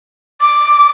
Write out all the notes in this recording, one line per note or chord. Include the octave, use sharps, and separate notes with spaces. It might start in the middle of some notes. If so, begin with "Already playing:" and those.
D6